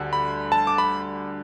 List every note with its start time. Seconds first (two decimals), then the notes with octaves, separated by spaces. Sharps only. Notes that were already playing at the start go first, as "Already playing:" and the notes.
Already playing: D2 D3 G3
0.13 B5
0.52 A5
0.67 D6
0.78 B5